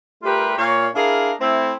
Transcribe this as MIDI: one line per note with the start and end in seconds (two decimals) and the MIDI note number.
0.23 0.56 55
0.23 0.56 57
0.23 0.56 65
0.23 0.56 67
0.23 0.56 70
0.23 0.56 71
0.57 0.87 46
0.57 0.87 73
0.57 0.87 77
0.94 1.31 62
0.94 1.31 64
0.94 1.31 68
0.94 1.31 70
0.94 1.31 77
1.40 1.73 57
1.40 1.73 60
1.40 1.73 64